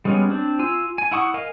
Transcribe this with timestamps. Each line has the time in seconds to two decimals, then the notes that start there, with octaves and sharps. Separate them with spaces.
0.05 G3 G#3 B3 C#4
0.30 C4 D4
0.59 F4 G#5 E6
0.98 G#5
1.12 E4 F#5 C#6 D#6
1.34 A#4 D#5 F5 G#5